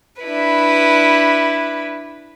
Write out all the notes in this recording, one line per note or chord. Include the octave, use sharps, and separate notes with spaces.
D4 E4 B4